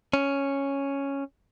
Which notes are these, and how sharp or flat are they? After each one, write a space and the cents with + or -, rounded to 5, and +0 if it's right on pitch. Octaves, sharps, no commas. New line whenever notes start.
C#4 +0